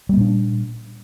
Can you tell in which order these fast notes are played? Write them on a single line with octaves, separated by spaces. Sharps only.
G3 A#3 A#2 D4